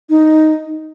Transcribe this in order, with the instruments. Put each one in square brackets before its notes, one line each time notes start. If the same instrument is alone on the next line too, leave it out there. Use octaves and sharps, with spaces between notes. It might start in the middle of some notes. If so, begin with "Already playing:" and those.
[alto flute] D#4